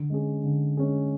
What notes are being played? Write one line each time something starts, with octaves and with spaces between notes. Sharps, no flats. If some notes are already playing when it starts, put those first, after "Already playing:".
Already playing: D3
G#3 C#4 G#4
D3
G#3 C#4 G#4